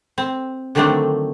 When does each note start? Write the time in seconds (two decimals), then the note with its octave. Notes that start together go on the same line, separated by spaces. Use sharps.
0.18 C4
0.75 D3 D#3 F#3 A3 C4 D4